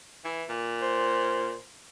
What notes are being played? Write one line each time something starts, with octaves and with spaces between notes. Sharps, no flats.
E3
A#2
C5